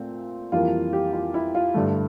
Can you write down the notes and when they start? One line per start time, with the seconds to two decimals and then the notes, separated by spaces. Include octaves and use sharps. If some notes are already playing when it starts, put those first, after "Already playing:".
Already playing: A#2 A3 C4
0.52 F2 E3 G3 A#3 F4
0.93 G4
1.13 F4
1.34 E4
1.55 F4
1.74 G2 D3 A3